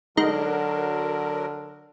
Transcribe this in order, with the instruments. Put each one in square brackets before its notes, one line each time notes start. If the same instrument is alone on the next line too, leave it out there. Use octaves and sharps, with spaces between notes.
[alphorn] D3 [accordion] F#3 A#4 [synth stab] G#3 D#4